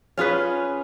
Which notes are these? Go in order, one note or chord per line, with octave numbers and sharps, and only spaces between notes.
C#4 F4 G#4 B4